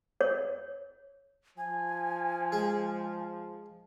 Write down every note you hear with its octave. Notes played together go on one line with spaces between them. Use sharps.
C#5
F3 G#5
G#3